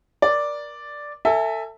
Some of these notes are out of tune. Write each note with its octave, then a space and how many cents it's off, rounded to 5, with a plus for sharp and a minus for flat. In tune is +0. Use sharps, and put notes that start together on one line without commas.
A#4 +30 D5 +0
A4 +30 E5 +0 G#5 +0